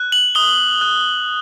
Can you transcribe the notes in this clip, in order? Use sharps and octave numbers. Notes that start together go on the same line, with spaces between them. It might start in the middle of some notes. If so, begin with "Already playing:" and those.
Already playing: F#6
F#7
D#6 G7
F#6